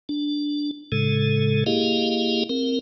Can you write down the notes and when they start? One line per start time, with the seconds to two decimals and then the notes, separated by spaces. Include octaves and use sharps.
0.09 D4
0.92 A2 C#3 G#3 A4
1.66 A#3 E4 G4 G#4 D#5 F5
2.49 C4 A#4